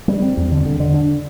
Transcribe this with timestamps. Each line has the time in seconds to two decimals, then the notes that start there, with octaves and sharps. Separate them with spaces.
0.08 G3
0.22 C4
0.37 E2
0.52 D3
0.65 D3
0.80 D3
0.94 D4